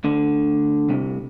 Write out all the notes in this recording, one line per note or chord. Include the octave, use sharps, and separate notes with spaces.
D2 D3
C2 C3